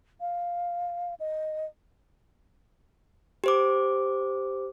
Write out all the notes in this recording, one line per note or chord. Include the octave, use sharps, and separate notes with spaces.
F5
D#5
G4 C5 D6